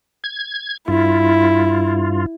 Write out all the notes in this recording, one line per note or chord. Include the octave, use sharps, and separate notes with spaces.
G#6
G2 E4 F4